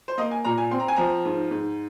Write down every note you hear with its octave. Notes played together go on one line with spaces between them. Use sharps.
C5
A#3 D#5
G#5
A#2 A#5
G#5
C4 C6
A#5
G#5
F3 A#5
G#2
G#2